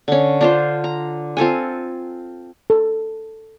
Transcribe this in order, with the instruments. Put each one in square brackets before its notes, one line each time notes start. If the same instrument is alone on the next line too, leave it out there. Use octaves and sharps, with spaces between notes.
[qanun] D3 C#4
D4 F4 C5
A#5
C4 F4 A4 G#5
[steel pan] A4